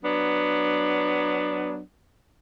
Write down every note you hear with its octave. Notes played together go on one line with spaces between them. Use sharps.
F#3 B3 D4